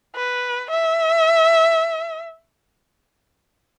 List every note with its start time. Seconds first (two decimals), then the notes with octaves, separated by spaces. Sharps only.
0.15 B4
0.71 E5